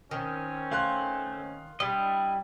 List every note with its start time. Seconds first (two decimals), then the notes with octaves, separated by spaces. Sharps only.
0.11 D#3 C4 C#4
0.71 A3 F5 C6 F#6
1.80 G3 D4 E4 D#5